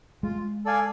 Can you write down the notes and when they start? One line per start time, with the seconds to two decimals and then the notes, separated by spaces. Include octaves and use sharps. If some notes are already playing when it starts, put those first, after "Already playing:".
0.23 G#3 F4
0.65 A4 D5 F5 G#5